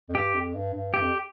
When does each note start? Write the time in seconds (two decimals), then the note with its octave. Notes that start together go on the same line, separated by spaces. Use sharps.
0.09 F2
0.15 G2 G4
0.34 F2
0.55 G2
0.74 G2
0.94 G2 G4
1.02 F2